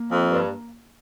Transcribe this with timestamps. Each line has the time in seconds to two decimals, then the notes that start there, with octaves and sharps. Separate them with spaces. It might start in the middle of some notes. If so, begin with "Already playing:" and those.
Already playing: A#3
0.12 F2
0.32 G2